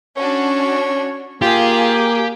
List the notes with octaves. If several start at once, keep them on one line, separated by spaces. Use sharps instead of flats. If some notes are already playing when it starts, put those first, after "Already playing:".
C#4 D4 F#4 C#5
A#3 F4 G4 G#4